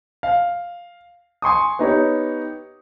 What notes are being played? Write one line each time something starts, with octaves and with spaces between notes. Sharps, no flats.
F5
G#5 C6 C#6 D#6
B3 D#4 G4 C#5